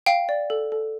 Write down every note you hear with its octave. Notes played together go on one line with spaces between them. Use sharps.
F5 G5
D5
A4
A4